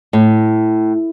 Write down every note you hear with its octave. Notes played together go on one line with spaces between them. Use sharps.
A2